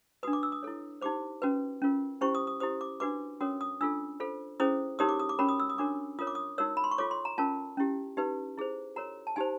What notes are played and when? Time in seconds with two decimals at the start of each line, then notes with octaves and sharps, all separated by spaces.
0.23 D4 F#4 B4 D#6
0.33 D6
0.43 E6
0.52 D#6
0.63 E4 A4 C#5
1.01 D#4 G4 C5 D6
1.42 C#4 F#4 B4
1.82 C#4 F4 A#4
2.21 C#4 E4 G4 C5 C#6
2.35 D#6
2.47 D#6
2.60 E4 G4 C5 D#6
2.81 D6
3.00 D4 F#4 B4 D6
3.40 C#4 F#4 A#4 C#5 D#6
3.61 D#6
3.81 D4 F4 A4 E6
4.20 F4 A4 C5
4.60 C#4 E4 G#4 C5 D#6
4.99 D#4 G4 A#4 C#5 D#6
5.09 D6
5.19 D#6
5.29 D6
5.39 C#4 F#4 A#4 C#5 B5
5.49 D#6
5.60 E6
5.69 D#6
5.78 D4 F#4 A#4 C#5 D6
6.19 F4 A#4 C#5 D#6
6.27 D6
6.35 D#6
6.58 D#4 F#4 A#4 C#5 E6
6.77 B5
6.84 C6
6.91 C#6
6.98 F4 A4 C#5 D6
7.11 C6
7.25 A#5
7.38 C#4 F4 A#4 A5
7.77 C#4 E4 G4
8.17 D#4 G4 B4
8.57 E4 G#4 C5
8.96 F#4 A#4 C#5 A#5
9.27 A5
9.36 D#4 G4 C5 G#5